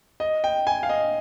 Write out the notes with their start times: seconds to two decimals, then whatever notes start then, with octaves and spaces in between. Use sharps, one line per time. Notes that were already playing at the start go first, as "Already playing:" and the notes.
0.20 D#5
0.44 G5
0.67 G#5
0.83 F5
0.89 D#5